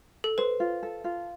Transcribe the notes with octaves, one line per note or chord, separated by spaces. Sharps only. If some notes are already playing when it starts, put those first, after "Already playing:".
A4
B4 C5
F4
A4
F4